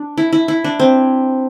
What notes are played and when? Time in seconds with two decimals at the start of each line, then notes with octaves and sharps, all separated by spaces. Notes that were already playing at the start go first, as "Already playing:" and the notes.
Already playing: D4
0.18 E4
0.33 E4
0.48 E4
0.64 D4
0.79 C4